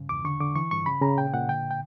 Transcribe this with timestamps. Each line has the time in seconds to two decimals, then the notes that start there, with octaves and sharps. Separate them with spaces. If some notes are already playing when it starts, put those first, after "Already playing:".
Already playing: G2 C#3
0.09 E2 D6
0.25 D3 C#6
0.41 D3 D6
0.56 E3 C#6
0.71 G2 C#6
0.86 C#3 B5
1.02 C#3 A#5
1.17 A#2 G5
1.34 A#2 F#5
1.49 D3 G5
1.71 G5